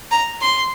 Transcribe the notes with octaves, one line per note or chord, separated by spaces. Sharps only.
A#5
C6